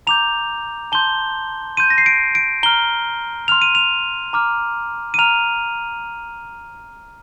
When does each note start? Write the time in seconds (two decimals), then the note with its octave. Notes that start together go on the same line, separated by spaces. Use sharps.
0.07 A#5 D6 G6 F7
0.92 A5 C6 G6 G7
1.77 C6 G6 D#7
1.90 A#6
1.98 C7
2.06 D7
2.35 D7
2.63 A#5 F6 G7
3.48 C6 F6 F7
3.62 D#7
3.75 F7
4.33 A#5 D6 F6
5.14 D#7
5.19 A#5 F6 F7